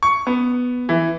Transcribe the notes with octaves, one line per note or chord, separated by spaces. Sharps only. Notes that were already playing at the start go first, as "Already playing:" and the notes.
C#6
B3
E3